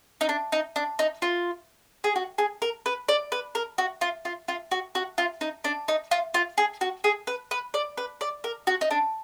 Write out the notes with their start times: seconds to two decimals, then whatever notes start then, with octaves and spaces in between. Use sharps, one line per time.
0.21 D#4
0.29 D4
0.52 D#4
0.76 D4
0.99 D#4
1.22 F4
2.04 G#4
2.16 F#4
2.38 G#4
2.62 A#4
2.86 B4
3.09 D5
3.32 B4
3.55 A#4
3.78 F#4
4.01 F4
4.25 F4
4.48 F4
4.71 F#4
4.95 F#4
5.18 F4
5.41 D#4
5.64 D4
5.88 D#4
6.11 F4
6.34 F4
6.58 G#4
6.81 F#4
7.04 G#4
7.27 B4
7.51 B4
7.74 D5
7.97 B4
8.21 D5
8.44 A#4
8.67 F#4
8.81 D#4
8.91 D4